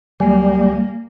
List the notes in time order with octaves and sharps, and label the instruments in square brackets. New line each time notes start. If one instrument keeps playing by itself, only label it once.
[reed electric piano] C#2 F#3 G#5 [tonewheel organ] G3 [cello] A#3